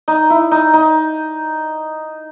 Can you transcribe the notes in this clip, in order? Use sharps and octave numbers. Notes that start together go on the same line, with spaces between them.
D#4
E4
D#4
D#4